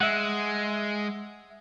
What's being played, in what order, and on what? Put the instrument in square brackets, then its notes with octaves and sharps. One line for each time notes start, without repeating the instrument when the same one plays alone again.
[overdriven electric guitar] G#3 [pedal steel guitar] E5 F#5